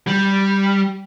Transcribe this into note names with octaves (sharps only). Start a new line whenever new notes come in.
G3